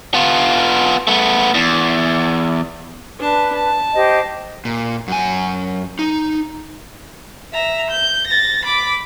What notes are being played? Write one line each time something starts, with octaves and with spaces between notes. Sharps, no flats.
B3 F4
A3 B3
E2
D4 B4 A5
A5
G4 C5 D#5
A#2
F#2 G#5
D#4
E5 A#5
G6
A6 A#6
B5 D6